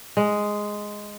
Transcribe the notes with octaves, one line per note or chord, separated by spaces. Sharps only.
G#3